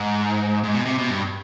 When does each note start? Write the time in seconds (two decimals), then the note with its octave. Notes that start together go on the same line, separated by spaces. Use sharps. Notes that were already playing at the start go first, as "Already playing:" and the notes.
Already playing: G#2
0.64 G#2
0.75 B2
0.85 C3
0.98 B2
1.10 G2